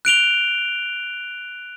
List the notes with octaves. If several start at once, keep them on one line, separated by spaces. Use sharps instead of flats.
F#6 D7 F7 G7